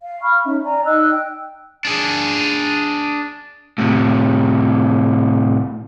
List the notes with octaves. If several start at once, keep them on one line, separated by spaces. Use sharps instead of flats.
F5
B5 C#6 F6
C#4 D#4 E5
D5 G#5 A#5
D#4 D#5 E6 F#6
G5
D4 G#4
A2 C3